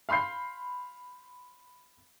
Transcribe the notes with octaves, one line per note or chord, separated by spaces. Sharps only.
F5 B5 C6 G6 C7